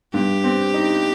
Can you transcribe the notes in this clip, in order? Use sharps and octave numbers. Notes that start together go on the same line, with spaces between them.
G2 G4
C4
D#4